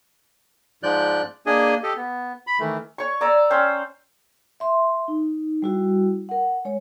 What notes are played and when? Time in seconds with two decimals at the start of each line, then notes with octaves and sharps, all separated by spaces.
0.83 G#2 F3 G#3 D5 F#6 G6
1.46 A#3 D4 G#4 D#5 G#5
1.83 G4 A4 D#5
1.97 B3
2.47 B5
2.60 D#3 E3 A3
2.98 C#5 C#6
3.21 D5 A#5 E6
3.50 C#4 C5 G5
4.60 E5 C6
5.08 D#4
5.62 G3 E4 F#4
6.29 A#4 F#5
6.65 G#3 C#5